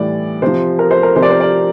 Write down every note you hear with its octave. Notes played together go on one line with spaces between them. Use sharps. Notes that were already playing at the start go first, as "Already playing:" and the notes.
Already playing: A2 E3 G3 D5
C3 F3 C5
A#4
C5
A#4
C3 F3 C5
D5
C5
D5